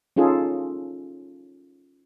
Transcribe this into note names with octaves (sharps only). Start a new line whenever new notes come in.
C#4 D#4 F4 G#4 A4